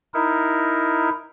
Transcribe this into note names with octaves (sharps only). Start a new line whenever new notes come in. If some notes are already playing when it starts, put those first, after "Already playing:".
D#4 E4 A#4